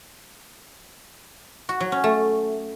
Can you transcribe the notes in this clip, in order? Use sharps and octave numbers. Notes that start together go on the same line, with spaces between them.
F#4
F#3
C#4
A3